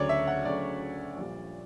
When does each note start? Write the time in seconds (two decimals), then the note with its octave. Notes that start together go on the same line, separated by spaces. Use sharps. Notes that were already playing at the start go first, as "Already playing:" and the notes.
Already playing: D2 C#3 F#3 C#5 D5
0.09 E5
0.27 F#5
0.45 D2 C#3 F#3 D5
1.17 A#1 A#2 G3